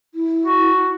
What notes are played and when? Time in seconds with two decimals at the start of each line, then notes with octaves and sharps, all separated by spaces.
0.14 E4
0.43 F#4